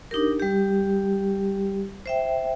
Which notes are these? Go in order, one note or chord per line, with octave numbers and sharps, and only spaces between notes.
D4 D#4 G4 A#4
G3 G4
C5 E5 G5